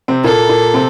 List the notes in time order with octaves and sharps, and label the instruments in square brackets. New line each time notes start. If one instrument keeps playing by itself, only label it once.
[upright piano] C3 C4
[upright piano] A#2 A#3 [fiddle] A4
[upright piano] A#2 A#3
C3 C4